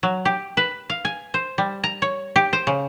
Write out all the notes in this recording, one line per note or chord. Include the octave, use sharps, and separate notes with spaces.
F#3
G4
B4
F5
G#5
C5
G3
A#5
C#5
G4
C5
C#3